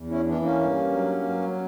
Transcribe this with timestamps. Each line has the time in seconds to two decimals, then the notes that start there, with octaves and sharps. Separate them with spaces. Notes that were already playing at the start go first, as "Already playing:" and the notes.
Already playing: E2
0.10 C#4 E4
0.27 E3 B3 D4
0.42 A#3 C#4
0.60 G2
0.92 F#3
1.24 F#3